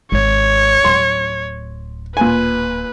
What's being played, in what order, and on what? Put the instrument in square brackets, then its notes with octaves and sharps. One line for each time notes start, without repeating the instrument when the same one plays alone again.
[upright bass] G#1 [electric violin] C#5
[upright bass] D1 [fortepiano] C6
[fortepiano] A#2 G#5 [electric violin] B4